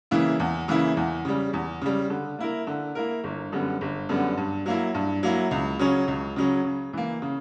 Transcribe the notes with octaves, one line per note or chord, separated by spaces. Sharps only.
C#3 E3 A#3 E4
E2
C#3 E3 A#3 E4
E2
C#3 G3
E2
C#3 G3
D3
A#3 E4 A#4
D3
A#3 E4 A#4
G1
F#2 D3 G3 B3
G1
F#2 D3 G3 B3
G2
F#3 A#3 E4
G2
F#3 A#3 E4
C#2
C#3 F#3 C#4
C#2
C#3 F#3 C#4
C#3
E3 A#3
C#3